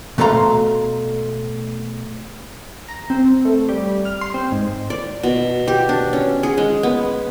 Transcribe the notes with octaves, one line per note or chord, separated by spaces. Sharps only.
B2 A3 A4 F5 A#5 C6
A#5
C4
A3
G3
F6
C6
C4
G#2
D5
B2
G4
D4
C#4
G#4
G#3
B3